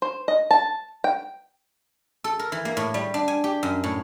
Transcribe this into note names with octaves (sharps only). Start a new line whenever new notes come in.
C5
D#5
A5
G5
A4
A#4
E3
A#3
A2
G3
D4
G#5
G4
F#2
A2